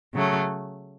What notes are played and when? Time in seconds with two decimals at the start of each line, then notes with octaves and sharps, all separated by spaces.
0.14 C#3 F#3 A3